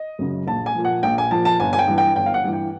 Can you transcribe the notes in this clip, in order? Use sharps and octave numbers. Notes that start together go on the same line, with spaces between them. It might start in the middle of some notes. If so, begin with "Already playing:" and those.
Already playing: D#5
F#2 C#3 F#3
A#1 A5
G#5
A#2 F3
F#5
A#1 G5
G#5
A#2 F3 A5
A5
G1 G#5
G#5
G5
G2 E3
G5
G1 G5
F5
F#5
G2 E3
G5